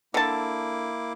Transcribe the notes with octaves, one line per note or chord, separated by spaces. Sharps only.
D3 A#3 E4 A5 D6